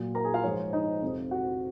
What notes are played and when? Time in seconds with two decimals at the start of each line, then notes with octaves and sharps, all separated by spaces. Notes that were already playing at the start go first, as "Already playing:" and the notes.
Already playing: A#2 F#3
0.15 A#4 A#5
0.24 G#4 G#5
0.34 F4 F5
0.43 G#2 F3 G#3 C#5
0.73 D#4 D#5
1.02 F2 C3 F3
1.31 F#4 F#5